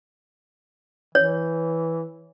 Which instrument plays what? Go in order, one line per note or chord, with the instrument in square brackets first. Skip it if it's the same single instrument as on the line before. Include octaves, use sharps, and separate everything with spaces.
[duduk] E3 [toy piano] C#5